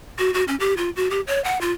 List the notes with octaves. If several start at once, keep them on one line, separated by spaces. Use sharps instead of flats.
F#4
F#4
C#4
G4
F4
F#4
G4
C#5
F#5
F4